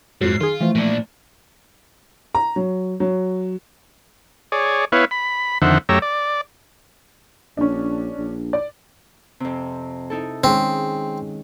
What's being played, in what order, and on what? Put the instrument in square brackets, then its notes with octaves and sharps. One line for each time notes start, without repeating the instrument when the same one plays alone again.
[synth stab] F2 F#3 [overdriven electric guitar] G#2 [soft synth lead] C7
[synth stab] D#3 G#4 [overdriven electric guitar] F4
[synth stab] E3 F3 [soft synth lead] A3
[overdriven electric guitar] A#2 D4
[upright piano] A#5
F#3
F#3
[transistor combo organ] G#4 C#5 D5
B3 E4 B4 C#5 F5
B5
F2 D3 D#3 C5 E5 F#5
F#2 A3 G4 C#5 A#5 E6
D5
[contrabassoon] A#1 [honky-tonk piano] C#4 D4
[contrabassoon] A#1
[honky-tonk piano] D5
[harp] F2 C3
D#4 E4 A4
[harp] D#3 G#3 C#4 [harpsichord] C4